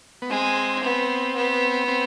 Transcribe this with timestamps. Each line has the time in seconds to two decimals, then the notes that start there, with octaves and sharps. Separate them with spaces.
0.22 B3
0.30 G#3 C4
0.83 B3
1.35 B3
1.88 C4